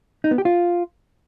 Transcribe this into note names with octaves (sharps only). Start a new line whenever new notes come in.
D#4
B3
G4
F4